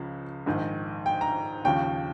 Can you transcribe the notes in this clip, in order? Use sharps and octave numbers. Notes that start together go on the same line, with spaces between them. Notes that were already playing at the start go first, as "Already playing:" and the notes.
Already playing: C#2 C#3 F3
A#1 G#2 D#3
G5
A#5
D#2 C#3 F3 G5